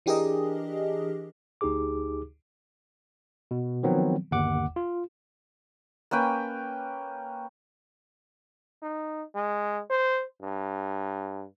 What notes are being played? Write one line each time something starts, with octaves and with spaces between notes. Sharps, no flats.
E3 D4 G4 G#4 A#4 D#5
D2 D#4 G4 G#4 D6
B2
D#3 F3 F#3 B3 C4
G1 D#2 F#5 D6
F4
A#3 C#4 B4 G5
D#4
G#3
C5
G2